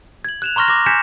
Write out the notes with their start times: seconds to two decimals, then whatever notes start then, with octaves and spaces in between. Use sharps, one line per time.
0.25 G#6 F#7
0.42 F#6 E7 F7
0.56 A#5 C6 C#6 F6 A#6
0.68 D6 A#6
0.86 G#5 G6 G#6 B6 C#7 E7